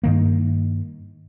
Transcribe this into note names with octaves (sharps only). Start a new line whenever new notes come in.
G2 D#3 A#3